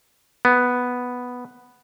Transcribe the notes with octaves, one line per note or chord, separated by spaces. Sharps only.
B3